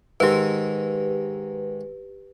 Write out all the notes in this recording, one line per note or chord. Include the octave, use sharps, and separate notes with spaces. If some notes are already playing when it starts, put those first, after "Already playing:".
G#2 D#3 G4 B4